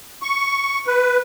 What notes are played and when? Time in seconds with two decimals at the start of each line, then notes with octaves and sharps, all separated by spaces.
0.22 C#6
0.87 B4